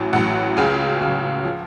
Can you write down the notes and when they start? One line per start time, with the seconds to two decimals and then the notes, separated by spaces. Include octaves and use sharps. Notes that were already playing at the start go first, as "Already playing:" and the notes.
Already playing: A1 A2 F#3 G#5
0.13 A1 A2 F#3 F#5
0.57 C#2 C#3 F#3 G#4
1.01 C#2 C#3 F#3 F#4
1.45 F3